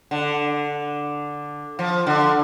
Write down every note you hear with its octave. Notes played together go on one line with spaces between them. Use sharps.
D3
F3
D3